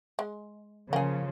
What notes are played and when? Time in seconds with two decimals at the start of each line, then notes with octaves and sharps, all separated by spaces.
0.19 G#3
0.93 C#3 F3 A#3 G#4